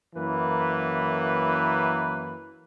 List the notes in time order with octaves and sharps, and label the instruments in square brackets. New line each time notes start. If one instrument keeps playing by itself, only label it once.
[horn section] F#2 E3 A#3 B4